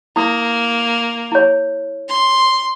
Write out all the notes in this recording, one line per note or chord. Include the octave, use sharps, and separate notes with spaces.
A#3 E4 D#6
E4 C#5
C6